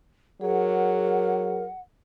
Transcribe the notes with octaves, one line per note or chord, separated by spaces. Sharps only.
F#3 G#4 A#4 F#5